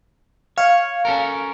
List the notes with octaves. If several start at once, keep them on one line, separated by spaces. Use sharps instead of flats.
C#5 F5
C#4 A4 A#4